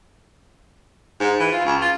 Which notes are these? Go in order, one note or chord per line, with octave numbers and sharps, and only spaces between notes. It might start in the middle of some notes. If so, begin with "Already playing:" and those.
G#2
E3
F4
C#2
F4